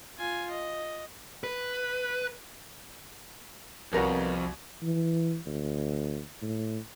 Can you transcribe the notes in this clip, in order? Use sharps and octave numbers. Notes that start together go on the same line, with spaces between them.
F4 G#5
D#5
B4
C2 F2 B3 F#4 A#4 C#5
E3
D2
A2